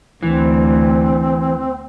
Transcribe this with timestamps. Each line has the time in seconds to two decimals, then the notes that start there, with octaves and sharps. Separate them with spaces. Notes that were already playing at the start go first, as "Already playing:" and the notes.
0.23 D2 E3 C4